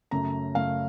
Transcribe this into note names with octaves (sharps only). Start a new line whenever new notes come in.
F#2 C#3 A3 A#5
F#2 C#3 A3 F5